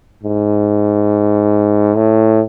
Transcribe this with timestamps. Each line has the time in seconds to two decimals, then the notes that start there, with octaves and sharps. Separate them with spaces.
0.24 G#2
1.96 A2